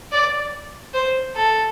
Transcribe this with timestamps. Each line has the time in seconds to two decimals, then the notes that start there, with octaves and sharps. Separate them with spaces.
0.12 D5
0.94 C5
1.36 A4